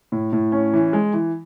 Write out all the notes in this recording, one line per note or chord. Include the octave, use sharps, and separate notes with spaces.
A2
A2
C#4
E3
G#3
E3